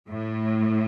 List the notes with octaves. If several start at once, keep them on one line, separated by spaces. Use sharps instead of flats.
A2